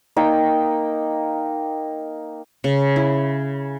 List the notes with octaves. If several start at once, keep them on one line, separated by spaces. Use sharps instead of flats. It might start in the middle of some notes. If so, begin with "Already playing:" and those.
A#3 D#4 A#4 G5
C#3
E4